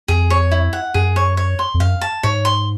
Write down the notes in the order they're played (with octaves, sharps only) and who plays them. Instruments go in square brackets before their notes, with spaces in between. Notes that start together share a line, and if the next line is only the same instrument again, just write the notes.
[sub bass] F2 [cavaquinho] G#4
[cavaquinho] C#5
E4
F#5
[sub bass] F#2 [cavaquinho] G#4
[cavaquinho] C#5
C#5
C6
[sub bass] F2
[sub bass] F#2 [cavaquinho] F5
[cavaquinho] A5
[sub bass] G#2 [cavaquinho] C#5
[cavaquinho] C6